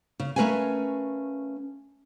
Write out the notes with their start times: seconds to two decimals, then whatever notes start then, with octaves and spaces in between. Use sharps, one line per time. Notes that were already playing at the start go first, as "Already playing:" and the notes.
0.20 C#3
0.36 A3 C#4 A#4 B4 F5 G#5